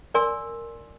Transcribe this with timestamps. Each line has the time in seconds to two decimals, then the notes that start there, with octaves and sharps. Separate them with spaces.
0.14 A#4 D5 G#5 C6 E6